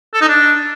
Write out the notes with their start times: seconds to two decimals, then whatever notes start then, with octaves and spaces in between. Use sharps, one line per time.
0.14 A4
0.21 D#4
0.28 D4